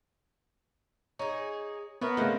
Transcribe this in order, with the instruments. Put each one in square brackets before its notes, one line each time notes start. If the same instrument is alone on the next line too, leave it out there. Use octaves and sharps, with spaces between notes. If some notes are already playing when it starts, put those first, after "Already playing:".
[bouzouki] D#4 G#4 [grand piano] C#5
[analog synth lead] B3 [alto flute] A#4 [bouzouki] C#5 E5
[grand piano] C#3 A3 [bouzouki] G#3 C4